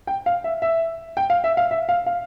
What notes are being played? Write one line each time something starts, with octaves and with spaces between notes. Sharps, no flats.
G5
F5
E5
E5
G5
F5
E5
F5
E5
F5
F5